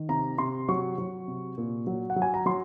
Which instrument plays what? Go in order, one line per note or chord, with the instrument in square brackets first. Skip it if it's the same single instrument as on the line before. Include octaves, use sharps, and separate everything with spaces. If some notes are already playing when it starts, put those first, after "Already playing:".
Already playing: [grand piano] D#3
C3 A#5
C3 C6
F#3 C#6
F#3
C3
A#2
F#3
F#5
F#3
G#5
A#5
F#3 C6